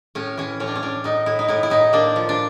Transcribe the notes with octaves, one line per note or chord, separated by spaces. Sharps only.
A2 C#4
E3 C#4
A2 C#4
D4
C#4
A2 D4
A2 D#4
A2 E4
D#4
A2 E4
E4
A2 D#4
A#3 D4
F3
D4